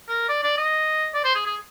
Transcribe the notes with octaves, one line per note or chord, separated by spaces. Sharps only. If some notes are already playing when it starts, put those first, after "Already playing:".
A#4
D5
D5
D#5
D5
C5
G#4
G#4